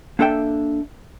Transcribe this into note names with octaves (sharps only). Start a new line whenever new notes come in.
A#3 D4 A4 E5 G5